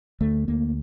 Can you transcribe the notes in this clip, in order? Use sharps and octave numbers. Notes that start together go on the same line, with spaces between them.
D2 A3
D2 A#3